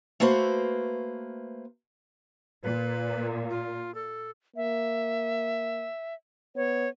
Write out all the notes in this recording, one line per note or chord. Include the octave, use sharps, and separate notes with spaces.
A3 A#3 F#4 B4 C5
A#2 B4
F4
A4
A#3 E5
B3 C#5